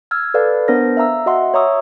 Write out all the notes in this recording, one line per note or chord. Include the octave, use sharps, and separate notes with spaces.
E6 F6 G#6
A4 B4 D5 F5 B5
B3 D4 A#4 C5 A#6
E5 F5 A#5 E6
F#4 D#5 E5 F#5 C6
C#5 E5 A#5 C#6 D#6 E6